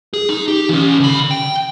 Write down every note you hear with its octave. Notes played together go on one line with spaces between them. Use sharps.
G#4
D#4
G4
E3 C#4
D3 B5
G5